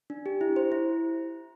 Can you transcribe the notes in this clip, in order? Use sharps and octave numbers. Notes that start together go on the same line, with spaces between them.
D4
G4
E4
C5
E4